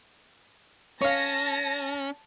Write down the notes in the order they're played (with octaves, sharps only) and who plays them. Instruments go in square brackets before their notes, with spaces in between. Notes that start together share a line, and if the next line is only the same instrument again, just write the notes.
[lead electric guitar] C#4 [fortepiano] C#5 F5 [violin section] A5 A#6